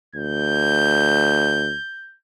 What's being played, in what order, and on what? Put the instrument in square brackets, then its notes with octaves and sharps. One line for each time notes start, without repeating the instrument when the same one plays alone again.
[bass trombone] D2 [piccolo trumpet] G6